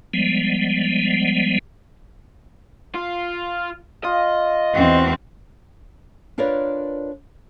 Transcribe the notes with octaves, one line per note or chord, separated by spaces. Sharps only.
F3 G3 G#3 B3
F4
F4 D#5
E2 C4 F#4
D4 F4 A#4 B4 C#5 D5